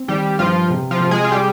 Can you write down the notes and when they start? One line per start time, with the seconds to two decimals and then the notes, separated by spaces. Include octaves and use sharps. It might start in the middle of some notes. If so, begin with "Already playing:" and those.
Already playing: C4
0.08 D#3 G3 G4
0.38 G2 F3 F4
0.70 C3
0.91 F3 F4
1.00 C3
1.11 G#3 G#4
1.24 F4
1.31 G3 G4 G#4